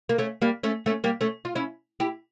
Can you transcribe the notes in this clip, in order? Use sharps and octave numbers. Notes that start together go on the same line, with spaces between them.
A#3
A3 C#4
G3 A#3
A3 C#4
A3 C#4
G3 A#3
A3 C#4
F4
C#4 E4
E4 G4